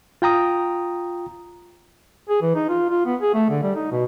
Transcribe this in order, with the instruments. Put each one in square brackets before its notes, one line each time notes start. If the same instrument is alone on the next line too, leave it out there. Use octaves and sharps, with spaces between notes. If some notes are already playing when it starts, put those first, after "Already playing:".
[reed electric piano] F4 G5 A#5 D#6
[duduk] G#4
E3
D#4
F4
F4
B3
G#4
A3
D3
G3
D#4
B2